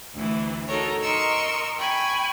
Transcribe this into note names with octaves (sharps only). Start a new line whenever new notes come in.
D2 E3
D#4 F#4 A4 A#4 C#5
A#4 D#5 C6 C#6 E6
G5 G#5 B5 C#6